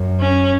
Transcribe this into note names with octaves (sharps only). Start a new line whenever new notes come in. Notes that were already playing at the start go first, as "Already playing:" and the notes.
Already playing: F#2
C#4